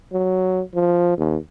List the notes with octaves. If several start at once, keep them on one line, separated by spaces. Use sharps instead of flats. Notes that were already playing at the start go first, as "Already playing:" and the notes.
F#3
F3
D#2